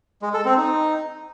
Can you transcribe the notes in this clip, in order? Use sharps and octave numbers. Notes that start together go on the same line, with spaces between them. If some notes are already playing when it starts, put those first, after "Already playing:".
G#3
A4
C4
D#4